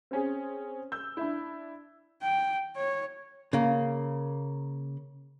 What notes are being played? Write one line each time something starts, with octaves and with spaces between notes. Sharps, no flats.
C4 C#4 G#4
E6 G6
D4 E4
G5
C#5
C#3 A#3